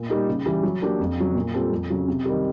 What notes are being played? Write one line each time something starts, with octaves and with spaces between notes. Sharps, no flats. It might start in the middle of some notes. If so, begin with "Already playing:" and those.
Already playing: A#2
G3 A#3 D#4
C#3
E3 G3
F#3
A#3 D4 G4
F2
C#3 F#3
A#2
G3 C4 F4 A4
F2
C#3 F#3
C3
D#3 G3